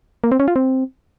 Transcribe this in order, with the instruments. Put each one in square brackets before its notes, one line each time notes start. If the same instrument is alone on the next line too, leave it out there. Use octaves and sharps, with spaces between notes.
[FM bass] A#3
C4
C#4
F4
C4